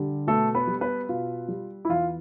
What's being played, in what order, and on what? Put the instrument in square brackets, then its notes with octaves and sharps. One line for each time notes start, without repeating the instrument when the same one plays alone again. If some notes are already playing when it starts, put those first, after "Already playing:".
Already playing: [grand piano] D3 G3
B2 A3 A4
B3 B4
G3
B3 B4
B2 F4
G3
E4
E2 F4